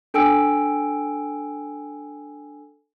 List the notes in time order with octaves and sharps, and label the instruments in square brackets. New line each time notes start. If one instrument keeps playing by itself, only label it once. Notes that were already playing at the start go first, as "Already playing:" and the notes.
[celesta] D4 A4 G5 G#5 E6 D7